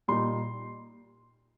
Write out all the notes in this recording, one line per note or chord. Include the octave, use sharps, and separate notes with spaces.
A#2 G3 A#3 D#4 C6